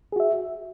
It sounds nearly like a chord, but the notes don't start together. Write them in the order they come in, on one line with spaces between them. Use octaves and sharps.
G#4 F#4 E5